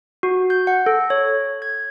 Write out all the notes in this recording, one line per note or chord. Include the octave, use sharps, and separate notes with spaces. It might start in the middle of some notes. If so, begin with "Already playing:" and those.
F#4
G6
F#5
A4
C#5
G#6